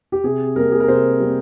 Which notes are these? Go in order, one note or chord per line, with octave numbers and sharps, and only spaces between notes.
G4
C3 G#4
G3 A#3 A#4
G#4
A#4
C3 C5
G3 A#3